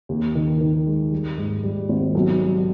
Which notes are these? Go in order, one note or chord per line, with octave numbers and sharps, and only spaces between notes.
D#2
D#3
D#3
G#3
G3
G#2
G3
G#1
B1
G3